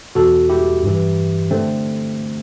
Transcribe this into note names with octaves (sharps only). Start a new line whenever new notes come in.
E2 B2 F#4 A4
E4 G4
G2 E3
D3 A3 C4